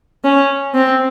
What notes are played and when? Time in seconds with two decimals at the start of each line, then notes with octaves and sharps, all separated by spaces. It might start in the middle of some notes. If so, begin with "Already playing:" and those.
0.24 C#4
0.75 C4